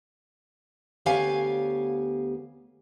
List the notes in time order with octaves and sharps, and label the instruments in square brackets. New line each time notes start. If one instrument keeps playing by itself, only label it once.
[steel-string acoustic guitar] D2 B3 G4 C#5 F5 G#5